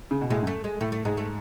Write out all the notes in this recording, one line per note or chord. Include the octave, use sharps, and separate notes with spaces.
C#3
B2
A2 G#3
F#2
A3
G#3
A2 A3
A3
G#2 G#3
A3